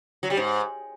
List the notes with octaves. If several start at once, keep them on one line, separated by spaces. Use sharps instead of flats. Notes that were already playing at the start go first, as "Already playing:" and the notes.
F#3
G3
G#2